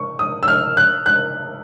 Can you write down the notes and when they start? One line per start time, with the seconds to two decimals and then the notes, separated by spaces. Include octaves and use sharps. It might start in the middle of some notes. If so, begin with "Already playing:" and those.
Already playing: C#6
0.19 D#6
0.43 E6
0.48 F6
0.77 F#6
1.06 F#6